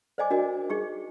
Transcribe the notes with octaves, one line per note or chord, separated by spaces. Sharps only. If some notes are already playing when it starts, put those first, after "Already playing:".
C5 D5 D#5 G#5 D6
D4 F#4 A#4 D#5
D#4 G#4 C#6